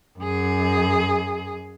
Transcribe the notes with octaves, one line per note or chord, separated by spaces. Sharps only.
F#2 G#4